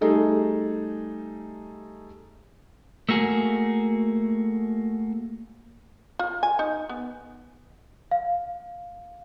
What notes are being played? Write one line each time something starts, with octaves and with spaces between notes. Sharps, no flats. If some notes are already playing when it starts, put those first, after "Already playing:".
G3 A3 D#4 G#4 A4
A3 A#3 F#4 G#4
F4
G#5
D#4
B3
F5